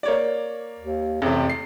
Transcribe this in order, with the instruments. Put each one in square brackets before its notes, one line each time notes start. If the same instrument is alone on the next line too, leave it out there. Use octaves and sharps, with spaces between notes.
[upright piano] A#3 C#5 D5
[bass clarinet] D#2
[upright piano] A1 C3 [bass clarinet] F2
[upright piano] C7